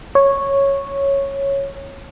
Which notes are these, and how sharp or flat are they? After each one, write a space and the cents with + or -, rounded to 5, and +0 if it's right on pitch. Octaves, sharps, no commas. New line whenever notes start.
C#5 -5